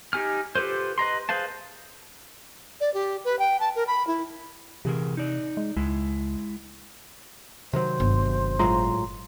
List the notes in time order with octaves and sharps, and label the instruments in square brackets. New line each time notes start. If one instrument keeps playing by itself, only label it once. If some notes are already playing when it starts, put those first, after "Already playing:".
[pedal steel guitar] D#4 G4 G#5 F6
F4 G4 A4 B4 C5
B4 D#5 A#5 C6
G#4 B4 C5 F5 A5
[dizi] D5
G4
B4
G5
A5
A#4
B5
E4
[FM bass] C3 [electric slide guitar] E3 G#4 A#4
[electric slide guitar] D#4 D5
[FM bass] G#3
[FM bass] C#2 [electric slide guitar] G#3 E4
[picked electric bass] C3 D#3 F#3 [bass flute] C5
[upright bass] G1
[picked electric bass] A2 F#3 G#3 [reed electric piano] F4 A#5 C6